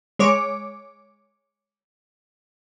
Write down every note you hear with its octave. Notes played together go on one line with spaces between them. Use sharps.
G#3 C#5 D6